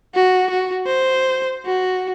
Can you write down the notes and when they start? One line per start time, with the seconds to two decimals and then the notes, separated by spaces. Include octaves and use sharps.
0.15 F#4
0.51 F#4
0.87 C5
1.66 F#4